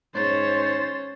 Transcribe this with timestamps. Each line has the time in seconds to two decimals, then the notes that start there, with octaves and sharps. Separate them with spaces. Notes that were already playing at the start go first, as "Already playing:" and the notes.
0.15 G#2 C#4 C5 C#5 A6